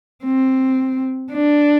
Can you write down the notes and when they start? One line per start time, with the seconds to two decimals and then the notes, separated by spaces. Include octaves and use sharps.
0.24 C4
1.32 D4